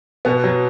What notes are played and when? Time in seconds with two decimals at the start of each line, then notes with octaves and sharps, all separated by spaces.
0.25 B2 B3
0.44 F#3